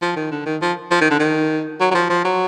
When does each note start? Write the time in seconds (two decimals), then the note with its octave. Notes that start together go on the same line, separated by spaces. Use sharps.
0.02 F3
0.16 D#3
0.31 D3
0.46 D#3
0.62 F3
0.91 F3
1.01 D#3
1.10 D3
1.19 D#3
1.80 F#3
1.91 F#3
1.94 F3
2.10 F3
2.25 F#3